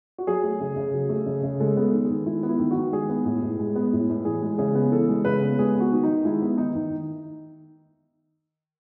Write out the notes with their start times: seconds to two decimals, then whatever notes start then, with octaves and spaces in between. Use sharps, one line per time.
0.18 F#4
0.27 F#3 G#4
0.44 A3
0.61 C#3
0.76 C#3
0.94 F#3
1.09 A3
1.26 C#3
1.43 C#3
1.60 G#3 A4
1.77 B3 A4
1.92 D#3
2.05 G#4
2.10 D#3
2.26 G#3 E4
2.43 B3
2.49 E4
2.59 D#3
2.71 F#4
2.76 D#3
2.92 G#3 G#4
3.09 B3
3.25 A2
3.42 A2
3.59 G#3
3.76 B3
3.93 A2
4.10 A2
4.25 E3 G#4
4.42 G#3
4.59 C#3 G#4
4.75 B3
4.91 E3 A4
5.09 G#3
5.25 C#3 B4
5.42 B3
5.59 G#3 G#4
5.75 B3
5.80 F#4
5.92 D#3
6.03 D#3 D#4
6.25 G#3 E4
6.42 B3
6.58 D#3 D#4
6.75 D#3